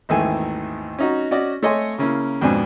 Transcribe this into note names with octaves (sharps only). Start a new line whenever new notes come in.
G#1 D#2 D#3 E3 A3 G#5
C#4 D#4 F#4
C#4 F#4 D5 D#5
A3 C#5 D#5 G#5 C6
C#3 A#3 C#4 E4
F2 G#2 B2 D4 G#5